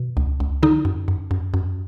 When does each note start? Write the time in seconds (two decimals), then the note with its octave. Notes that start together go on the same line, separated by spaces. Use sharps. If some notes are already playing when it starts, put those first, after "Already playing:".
Already playing: B2
0.17 C#2
0.40 C#2
0.63 D3 D#4
0.85 F#2
1.08 F#2
1.31 F#2
1.54 F#2